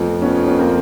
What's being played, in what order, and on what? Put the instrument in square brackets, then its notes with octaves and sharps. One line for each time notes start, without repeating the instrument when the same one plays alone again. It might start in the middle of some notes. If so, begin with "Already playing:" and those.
Already playing: [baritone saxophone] F2 [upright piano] A3 B3
[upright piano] B3 C#4
B3 C#4
A#3 C4